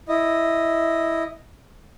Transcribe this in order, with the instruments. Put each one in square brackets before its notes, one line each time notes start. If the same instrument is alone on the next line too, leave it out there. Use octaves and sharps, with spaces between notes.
[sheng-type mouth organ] E4 D#5